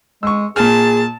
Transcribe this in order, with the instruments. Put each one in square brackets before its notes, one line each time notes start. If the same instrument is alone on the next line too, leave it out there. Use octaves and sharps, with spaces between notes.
[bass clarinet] G#3 [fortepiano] C#6 E6
[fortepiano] A#2 F6 [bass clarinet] G#4 [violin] A5